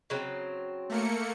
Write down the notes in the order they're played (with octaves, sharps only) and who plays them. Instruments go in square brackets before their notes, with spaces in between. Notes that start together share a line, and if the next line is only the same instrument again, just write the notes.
[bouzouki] C#3 F#3 C4
[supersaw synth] A3 A#3 C#7